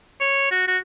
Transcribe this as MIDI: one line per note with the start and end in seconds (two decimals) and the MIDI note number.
0.21 0.50 73
0.51 0.63 66
0.68 0.78 66